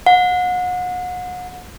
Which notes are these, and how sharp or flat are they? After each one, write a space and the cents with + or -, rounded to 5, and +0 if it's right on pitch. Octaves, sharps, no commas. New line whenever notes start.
F#5 -35